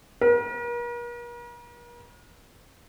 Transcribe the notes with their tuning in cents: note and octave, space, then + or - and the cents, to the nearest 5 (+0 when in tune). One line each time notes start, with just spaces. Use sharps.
A#4 +45